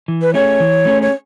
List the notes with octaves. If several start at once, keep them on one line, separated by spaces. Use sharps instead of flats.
E3
B4
A3 C#4 G#4 C#5
E3
A3 C#4 G#4
C#5